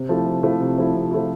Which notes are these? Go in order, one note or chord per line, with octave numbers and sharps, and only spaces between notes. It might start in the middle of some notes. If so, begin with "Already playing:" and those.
Already playing: C3
F3 A3 E4
C3
F3 A3 E4
C3
F3 A3 E4
C3
F3 A3 E4